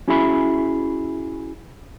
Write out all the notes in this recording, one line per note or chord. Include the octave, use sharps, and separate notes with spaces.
C#4 E4 F#4 G#4 E5 B5